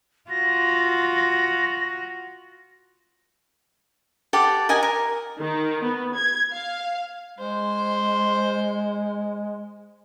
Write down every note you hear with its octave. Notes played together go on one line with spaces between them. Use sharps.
F4 F#4 A#6
G4 A4 D5 F#5
A#4 D#5 F#5 G#5
A#4
D#3
B3
G#6
F5
G#3 C5